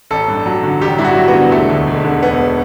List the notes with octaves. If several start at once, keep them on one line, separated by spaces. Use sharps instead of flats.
A1 A4
G2
F#3
D3
A1 G4
G2 E4
F#4
F#3
B3
D3
E1 A3
D2
E1
D3
E1 B3